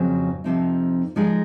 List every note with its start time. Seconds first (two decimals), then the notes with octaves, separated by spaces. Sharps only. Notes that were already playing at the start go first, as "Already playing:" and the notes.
Already playing: F2 C#3 F#3 C4
0.44 F2 C3 F3 C4 D#4
1.16 F3 G#3 D#4 A#4